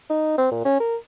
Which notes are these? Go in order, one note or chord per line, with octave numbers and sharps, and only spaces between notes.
D#4
C4
A#2
C#4
A#4